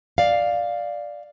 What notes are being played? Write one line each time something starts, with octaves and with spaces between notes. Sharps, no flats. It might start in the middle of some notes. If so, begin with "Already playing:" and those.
D5 F5